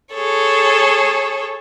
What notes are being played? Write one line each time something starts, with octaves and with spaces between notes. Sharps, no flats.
G#4 A4 C#5